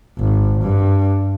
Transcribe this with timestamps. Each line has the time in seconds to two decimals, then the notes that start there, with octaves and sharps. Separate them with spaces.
0.19 G#1
0.61 G2